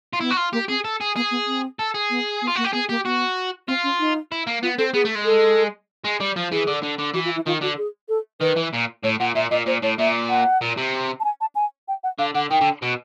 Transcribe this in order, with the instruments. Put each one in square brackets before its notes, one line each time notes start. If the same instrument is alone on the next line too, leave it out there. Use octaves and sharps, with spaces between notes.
[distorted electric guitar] F4
[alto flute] B3 [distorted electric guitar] E4
[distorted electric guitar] F#4
F4
[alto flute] A#3 [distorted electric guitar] G4
[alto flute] C4 [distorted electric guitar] G#4
[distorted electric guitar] A4
G#4
[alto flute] B3 [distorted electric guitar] G#4
[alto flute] B3
C4
[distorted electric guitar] A4
G#4
[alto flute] B3
B3
[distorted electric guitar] F4
[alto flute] A#3 [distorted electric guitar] F#4
[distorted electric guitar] G4
[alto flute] B3 [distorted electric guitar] G#4
[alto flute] A#3 [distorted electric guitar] G4
[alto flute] B3 [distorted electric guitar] F#4
[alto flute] C4 [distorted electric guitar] F4
[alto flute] C#4
D#4
[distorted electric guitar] E4
A#3
[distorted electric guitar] B3 [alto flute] F4
[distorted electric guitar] C4 [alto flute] A4
[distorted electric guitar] B3 [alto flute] G#4
[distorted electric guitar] A3
G#3
[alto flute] A4
[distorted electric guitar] G#3
G3
F3
[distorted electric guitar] E3 [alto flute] G#4
[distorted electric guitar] D3
D3
D3
[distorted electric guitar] E3 [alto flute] F#4
[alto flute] F4
E4
[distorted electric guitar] D#3 [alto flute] F4
[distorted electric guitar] D3 [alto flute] F#4
[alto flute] G#4
A4
[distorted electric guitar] D#3 [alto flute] B4
[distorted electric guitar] E3
A#2
[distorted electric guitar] A2 [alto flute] C#5
[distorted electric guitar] A#2 [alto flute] F#5
[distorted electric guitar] A#2 [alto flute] E5
[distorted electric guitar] A#2 [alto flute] D#5
[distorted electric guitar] A#2 [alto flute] C5
[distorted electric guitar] A2 [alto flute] C#5
[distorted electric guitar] A#2 [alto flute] E5
[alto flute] F#5
[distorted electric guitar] A#2
C3
[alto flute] A5
G#5
A5
G#5
G5
F#5
[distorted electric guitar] D3 [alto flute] F5
[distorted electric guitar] D3 [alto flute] F#5
[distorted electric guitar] D#3 [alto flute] G5
[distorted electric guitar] D3
B2